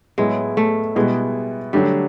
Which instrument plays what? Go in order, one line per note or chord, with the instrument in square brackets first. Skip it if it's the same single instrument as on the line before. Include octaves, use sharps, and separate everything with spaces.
[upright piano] A2 F#3 B3 E4 [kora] G#3
[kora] A3
[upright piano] B2 G3 B3 E4 [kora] G#3
[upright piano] D3 F#3 A3 D4 [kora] G3